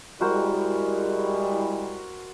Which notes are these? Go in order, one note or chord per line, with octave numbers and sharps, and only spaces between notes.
G3 G#3 E4 F#4 A#4 C5